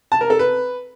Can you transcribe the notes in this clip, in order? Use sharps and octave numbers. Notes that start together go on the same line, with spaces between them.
A5
A#4
A4
B4